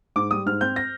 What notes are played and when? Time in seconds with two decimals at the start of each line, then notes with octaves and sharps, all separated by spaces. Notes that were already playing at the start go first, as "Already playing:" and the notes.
0.16 G#2 D6
0.31 G3 D#6
0.46 G#2 F6
0.61 C4 G6
0.76 A#6